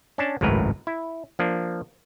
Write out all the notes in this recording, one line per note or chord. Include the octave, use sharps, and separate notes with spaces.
C#4 D4 A5
G#1 C#2 F#2 A2 A#4 B4
E4
F3 A#3 D4